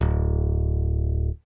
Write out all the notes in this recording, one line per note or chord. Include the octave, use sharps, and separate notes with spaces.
D1